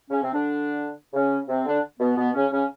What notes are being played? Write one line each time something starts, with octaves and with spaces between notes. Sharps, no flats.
C#3 C#4
C3 C4
D3 D4
C#3 C#4
C3 C4
D3 D4
B2 B3
B2 B3
C#3 C#4
C#3 C#4